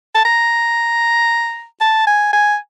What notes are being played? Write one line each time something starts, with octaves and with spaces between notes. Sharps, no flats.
A5
A#5
A5
G#5
G#5